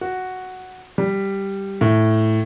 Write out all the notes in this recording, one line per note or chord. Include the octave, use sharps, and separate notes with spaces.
F#4
G3
A2